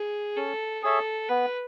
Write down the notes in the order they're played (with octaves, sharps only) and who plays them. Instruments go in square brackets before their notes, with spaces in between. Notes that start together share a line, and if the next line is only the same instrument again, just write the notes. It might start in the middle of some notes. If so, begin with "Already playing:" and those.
Already playing: [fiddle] G#4
[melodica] C#4 [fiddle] A4
[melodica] G#4 C#5 E5 [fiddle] A4
[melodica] B3 [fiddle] B4